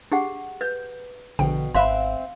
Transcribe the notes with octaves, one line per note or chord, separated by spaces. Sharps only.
D4 G4 G#4 F#5
B4 G6
A#1 B2 D3 G5
G#1 C4 E5 F5 B5 C6 F#6